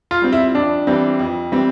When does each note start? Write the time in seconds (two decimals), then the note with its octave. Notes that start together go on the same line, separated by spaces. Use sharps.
0.11 F4
0.22 G3 C4 F4
0.33 E4
0.54 F2 D4
0.87 E3 G3 C4
1.19 F2
1.52 E3 G3 C4